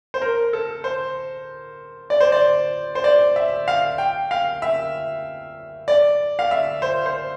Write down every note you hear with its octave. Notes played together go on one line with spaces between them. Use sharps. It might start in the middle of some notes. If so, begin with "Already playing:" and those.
C5
A#4
A4
C5
D5
C5
D5
C5
D5
E5
F5
G5
F5
E5
D5
F5
E5
C5
C5